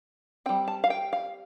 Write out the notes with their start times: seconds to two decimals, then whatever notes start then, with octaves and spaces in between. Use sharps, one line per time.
0.46 C4 G5
0.49 G3
0.68 A5
0.84 F5
0.90 G5
1.13 F5